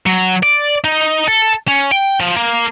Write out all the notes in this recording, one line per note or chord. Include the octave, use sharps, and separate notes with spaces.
F#3
D5
D#4
A4
C#4
G5
F3
A#3